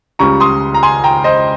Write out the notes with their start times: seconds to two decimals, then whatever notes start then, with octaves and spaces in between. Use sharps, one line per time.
0.19 C#2 C#3 G3 A#5 C#6
0.40 C6 D#6
0.74 A#5
0.83 G#5 C6
1.04 G5 A#5
1.24 C5 D#5